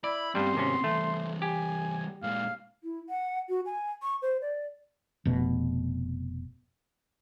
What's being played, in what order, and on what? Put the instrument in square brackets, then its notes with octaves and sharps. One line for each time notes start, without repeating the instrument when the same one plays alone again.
[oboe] E4 [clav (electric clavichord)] D5 [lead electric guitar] B5
[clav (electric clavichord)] G2 G3 [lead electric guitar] B3 C4 [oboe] C6
[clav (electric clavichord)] G#1 C3 C#4
[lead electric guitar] E3 G3 [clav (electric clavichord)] A3
[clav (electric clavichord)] G4 [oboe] G#5
[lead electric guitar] A#2 G#3 [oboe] F5
[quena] E4
F#5
F#4
G#5
C#6
C5
D5
[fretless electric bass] F1 B2